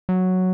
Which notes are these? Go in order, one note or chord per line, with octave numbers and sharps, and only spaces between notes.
F#3